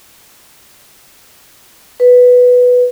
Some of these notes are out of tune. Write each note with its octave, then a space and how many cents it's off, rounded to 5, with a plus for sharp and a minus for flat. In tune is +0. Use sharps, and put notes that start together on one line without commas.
B4 +0